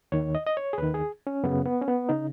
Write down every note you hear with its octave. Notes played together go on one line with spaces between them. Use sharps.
D#2 D#3 C#5
D#5
D#5
C#5
G#4
D#2 D#3 B4
G#4
C#4
F#2 C#3 B3
B3
C#4
B3
C#3 D#4